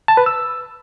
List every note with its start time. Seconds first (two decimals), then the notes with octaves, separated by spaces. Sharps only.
0.08 A5
0.17 B4
0.26 E6